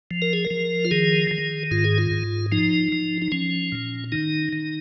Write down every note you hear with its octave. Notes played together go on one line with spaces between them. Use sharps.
F3
A#4
G#4
A#4
F3
F4
D#3 G#4
D#3
G#2 F4
G#4
F4
G#2
F3 D#4
F3
D#4
F3 C#4
A#2
D#3 D#4
D#3